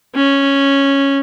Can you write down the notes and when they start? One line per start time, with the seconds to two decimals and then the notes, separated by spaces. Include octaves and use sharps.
0.15 C#4